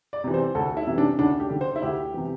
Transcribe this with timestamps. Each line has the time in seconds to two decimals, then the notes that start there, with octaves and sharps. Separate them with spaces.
0.13 D5
0.24 C3 E3
0.34 C5
0.55 D2 A4
0.77 E4
0.87 C3 E3
0.98 D4
1.19 D2 D4
1.40 G4
1.50 D3
1.61 C5
1.76 E4
1.82 D2 G4
2.14 C3 E3